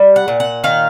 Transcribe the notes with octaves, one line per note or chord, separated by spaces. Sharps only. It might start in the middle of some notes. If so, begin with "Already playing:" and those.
Already playing: G3
F#5
A#2
F#5
D#3 F5